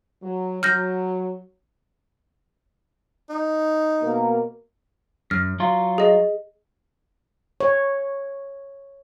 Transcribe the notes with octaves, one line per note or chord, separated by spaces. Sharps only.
F#3
F#3 F6 G6 A#6
D#4
B2 A#3 A#4
F#2 F6
F#3 F4
G#4 D#5
C#5